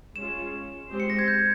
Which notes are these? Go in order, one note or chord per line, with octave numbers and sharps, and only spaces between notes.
G#3 C#4 F4 E7
G#3 C4 G4 C5
C#7
A#6
G#6
G6